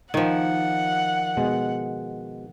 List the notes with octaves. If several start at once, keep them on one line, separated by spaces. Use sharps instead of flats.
D#3 F3 F#5
B2 G#3